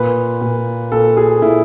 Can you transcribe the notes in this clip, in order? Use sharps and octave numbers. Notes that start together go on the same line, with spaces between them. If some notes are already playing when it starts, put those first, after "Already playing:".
Already playing: A#2 B4
A#2
A#2 A4
G#4
A#2 E4